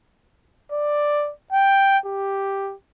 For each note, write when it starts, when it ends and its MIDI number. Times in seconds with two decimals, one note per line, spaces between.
0.72 1.32 74
1.52 1.98 79
2.06 2.74 67